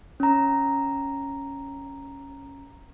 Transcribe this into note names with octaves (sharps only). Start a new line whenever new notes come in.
C#4 A#5